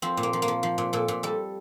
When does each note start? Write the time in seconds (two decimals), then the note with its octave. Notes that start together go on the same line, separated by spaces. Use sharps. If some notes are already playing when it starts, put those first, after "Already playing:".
0.02 F3 C4
0.17 A#2
0.23 A#3
0.33 F3
0.42 A#3
0.48 F3
0.63 F3
0.78 A#2
0.93 A#2 A4
1.08 A#2
1.23 G3 A4